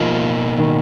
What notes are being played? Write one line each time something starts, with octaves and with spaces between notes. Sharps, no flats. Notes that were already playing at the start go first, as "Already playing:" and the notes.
Already playing: B2 F3 A#3 D#4 A#4 D#5
D#3